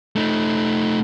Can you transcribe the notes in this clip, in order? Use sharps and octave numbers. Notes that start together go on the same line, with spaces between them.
A3 D#4